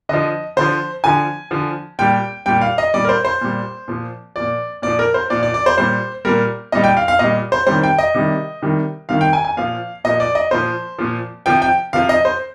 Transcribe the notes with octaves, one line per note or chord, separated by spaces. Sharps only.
D3 F3 D#5
D3 F3 C5
D3 F3 G#5
D3 F3
A#2 G3 G5
A#2 G3 G5
F5
D#5
A#2 G3 D5
A#4
C5
C5
A#2 G3
A#2 F3
A#2 F3 D5
A#2 F3 D5
A#4
C5
A#2 F3 D5
D5
D5
C5
A#2 G3 C5
A#2 G3 A#4
A#2 G3 D#5
G5
F5
F5
A#2 G3 D#5
C5
C3 D#3 G3 C5
G5
D#5
C3 D#3 G3
C3 D#3 G3
C3 D#3 G3 F5
G5
G#5
G#5
A#2 F3 F5
A#2 F3 D#5
D5
D#5
A#2 F3 C5
A#2 F3
C3 F3 G5
G5
C3 F3 F5
D#5
C5